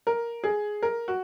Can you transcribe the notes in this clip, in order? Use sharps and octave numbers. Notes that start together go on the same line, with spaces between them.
A#4
G#4
A#4
F#4